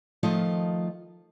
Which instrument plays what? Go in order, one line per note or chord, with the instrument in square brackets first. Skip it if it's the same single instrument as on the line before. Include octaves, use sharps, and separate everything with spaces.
[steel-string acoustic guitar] D#3 F3 A3 F4 D#5